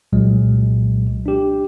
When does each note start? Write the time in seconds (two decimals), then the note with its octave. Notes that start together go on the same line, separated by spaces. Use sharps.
0.13 C2 A#2 F#3 G#3
1.26 D4 G4